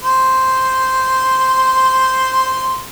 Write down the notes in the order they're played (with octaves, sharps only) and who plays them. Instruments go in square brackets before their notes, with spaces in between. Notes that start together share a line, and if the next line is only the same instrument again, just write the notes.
[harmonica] C5 C6